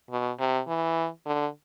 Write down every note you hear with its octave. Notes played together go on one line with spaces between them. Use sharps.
B2
C3
E3
D3